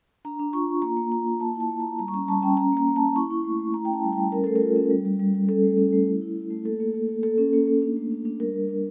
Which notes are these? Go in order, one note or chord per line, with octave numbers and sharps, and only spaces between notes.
D4 A#5
D4
F4 C#6
F4
A#3 A#5
A#3
F4 A#5
F4
A#3 A5
E4
A5
A#3
A#5
A#3
G3 A#5
C#6
C#4 A#5
G3 A5
C#4 G5
C#4 A#5
A#3 A#5
A#3
A5
A#3
E4 C#6
E4
A3
A3
E4 A#5
G5
C#4 A5
G3
G5
G3
C#4 A#4
A3 A4
A#4
F4
C#4
G3
G3
G3
G3
C#4 A4
A3
C#4
A3
E4
E4
E4
A3
A#3 A4
A#3
A#3
A#3
A#3 A4
C#4
A#3
A#3
D4
A3
D4
D4
G3 A#4
G3
D4